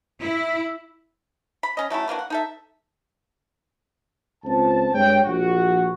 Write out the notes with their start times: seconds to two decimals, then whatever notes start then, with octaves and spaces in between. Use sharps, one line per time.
0.21 E4
1.63 B5
1.77 C#4 D#5
1.90 F#3 A3 C#4 E4
2.08 E3 A#3 D4 F#4
2.19 F#5
2.30 D#4 A4 E5
4.44 C#2 C4 F4 C5 A5
4.94 G2 G#3 G#4 C#5 G5
5.24 A#1 F#4